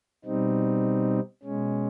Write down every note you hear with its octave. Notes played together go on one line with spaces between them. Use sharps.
B2 G3 C4 D#4
B2 G#3 C#4